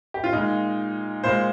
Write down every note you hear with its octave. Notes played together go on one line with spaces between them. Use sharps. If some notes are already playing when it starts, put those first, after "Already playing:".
G4
F4
A#2 G#3 D#4
A#2 G#3 C5